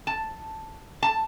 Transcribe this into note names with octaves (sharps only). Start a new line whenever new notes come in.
A5
A5